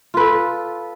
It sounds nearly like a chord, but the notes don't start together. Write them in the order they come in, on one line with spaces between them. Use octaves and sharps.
F4 B4 A4